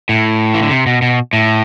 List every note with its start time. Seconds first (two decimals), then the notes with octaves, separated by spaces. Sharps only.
0.09 A2
0.54 E3
0.63 D3
0.71 C3
0.87 B2
1.02 B2
1.33 A2